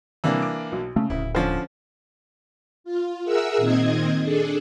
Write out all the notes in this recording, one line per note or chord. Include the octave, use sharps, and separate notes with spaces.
C3 E3 G3 A#3 D4
D6
B1
C#3 A3
D1 E4
D3 F3 C#4 C5
F4
G#4 A#4 E5 F#5 E6
A#2 D#3 C4 D#5 G#6
D4 G#4 A4